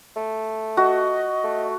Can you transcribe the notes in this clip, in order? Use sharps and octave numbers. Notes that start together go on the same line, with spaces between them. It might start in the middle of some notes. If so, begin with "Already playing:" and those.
A3
F#4 D#5
A3